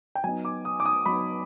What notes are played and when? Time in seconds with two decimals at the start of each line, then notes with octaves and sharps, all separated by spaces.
0.15 G5
0.24 F#3 B3 D#4 G#5
0.45 D6
0.65 D#6
0.80 D6
0.86 D#6
1.06 F#3 B3 D#4 B5